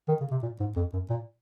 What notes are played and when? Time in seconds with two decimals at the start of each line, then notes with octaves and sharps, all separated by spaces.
0.09 D#3
0.21 C#3
0.31 C3
0.43 A#2
0.60 G#2
0.76 F2
0.93 F#2
1.10 A#2